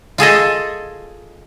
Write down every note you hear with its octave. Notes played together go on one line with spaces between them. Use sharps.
F4 G#4 A4 D#5